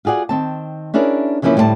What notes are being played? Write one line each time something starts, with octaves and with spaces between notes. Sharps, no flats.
F4 F#4 G#4 D5 F#5
D#3 C4 A5
C#4 D4 E4 G#4 A#4
C#3 E3 F3 A#3 C#4 E4
D2 A2 G3 A#4 C5 A5